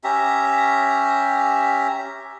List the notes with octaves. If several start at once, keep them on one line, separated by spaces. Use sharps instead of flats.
C#4 G4 E5 A#5